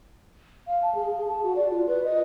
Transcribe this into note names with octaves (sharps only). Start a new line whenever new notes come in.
F5
A5
G#4
G#4
A5
F#4
D5
F4
B4
D#5